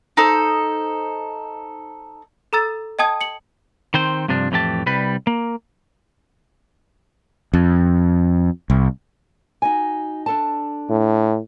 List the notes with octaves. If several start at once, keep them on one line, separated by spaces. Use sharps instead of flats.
D#4 A4 C5
A4 A#5 E6 A6
D#5 G5 A5 D#6 G#6
C#7 F#7
D#3 C4 C5
G2 C3 F3 D4
F2 A2 E3 G4 A5
C2 G3 B4
A#3
F2
C2
D#4 F#4 G#5
D4 A4 A5
A2